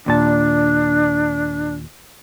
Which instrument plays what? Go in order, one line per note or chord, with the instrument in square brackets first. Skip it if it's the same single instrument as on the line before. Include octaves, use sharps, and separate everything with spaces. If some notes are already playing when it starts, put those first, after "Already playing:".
[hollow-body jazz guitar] D#2 A#2 A5 [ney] D4